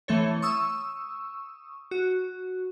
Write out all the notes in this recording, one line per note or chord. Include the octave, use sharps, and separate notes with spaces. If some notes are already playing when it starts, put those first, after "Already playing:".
E3 A3 C4 A4 C#5
C#6 D#6 E6
F#4